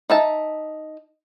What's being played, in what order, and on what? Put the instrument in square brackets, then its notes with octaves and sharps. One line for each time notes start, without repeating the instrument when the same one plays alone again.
[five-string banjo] D#4 E5 A5